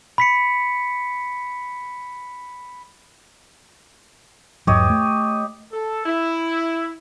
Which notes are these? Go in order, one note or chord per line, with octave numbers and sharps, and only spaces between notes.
B5 B6 C#7
E2 G#2 F#3 G4 C#5 D#5
A3
A4
E4